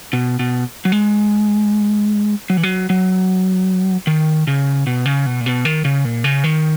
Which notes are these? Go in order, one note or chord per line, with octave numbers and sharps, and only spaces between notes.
B2
B2
F#3
G#3
F#3
E3
F#3
F#3
D#3
C#3
B2
C#3
B2
A#2
B2
D#3
C#3
A#2
C#3
D#3